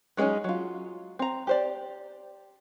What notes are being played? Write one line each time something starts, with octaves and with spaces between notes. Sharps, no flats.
F#3 G#3 C4 C#4 D#4
F#3 F4
C4 A#5
G4 C5 D5